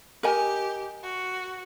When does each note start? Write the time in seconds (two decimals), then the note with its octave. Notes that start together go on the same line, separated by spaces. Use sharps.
0.23 G4 A#4 D#5 G#5
1.04 F#4